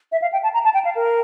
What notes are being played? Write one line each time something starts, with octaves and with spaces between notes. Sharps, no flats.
E5
F5
G5
A5
A#5
A5
G5
F5
A#4